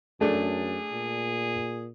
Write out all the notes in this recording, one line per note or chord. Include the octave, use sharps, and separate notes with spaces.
F#2 A3 D4 G#4
A#2